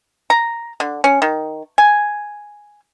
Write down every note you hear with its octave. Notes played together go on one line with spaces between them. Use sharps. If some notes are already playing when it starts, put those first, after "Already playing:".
A#5
D3
C#4
D#3
G#5